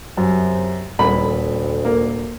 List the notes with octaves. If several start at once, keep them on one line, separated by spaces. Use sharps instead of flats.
F#2 C3
D#1 D2 B5
A#3